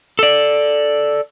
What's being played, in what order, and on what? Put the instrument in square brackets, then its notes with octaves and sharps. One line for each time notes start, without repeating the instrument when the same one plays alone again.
[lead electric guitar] A4 D5